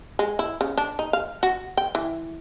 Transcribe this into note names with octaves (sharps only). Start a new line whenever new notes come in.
G#3
E4
C#3
D4
D#4
F5
F#4
G5
E3